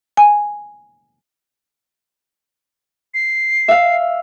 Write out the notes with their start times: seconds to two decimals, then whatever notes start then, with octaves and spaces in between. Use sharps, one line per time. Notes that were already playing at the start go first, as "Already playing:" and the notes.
0.17 G#5
3.14 C7
3.68 E5 F5